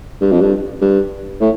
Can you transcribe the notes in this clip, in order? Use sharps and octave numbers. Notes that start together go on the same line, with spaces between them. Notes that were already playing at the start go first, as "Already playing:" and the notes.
G2
F2
G2
G2
A2